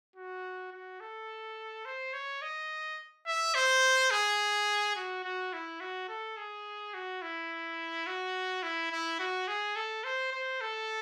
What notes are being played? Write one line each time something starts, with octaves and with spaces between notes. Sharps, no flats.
F#4
F#4
A4
C5
C#5
D#5
E5
C5
G#4
F#4
F#4
E4
F#4
A4
G#4
F#4
E4
F#4
E4
E4
F#4
G#4
A4
C5
C5
A4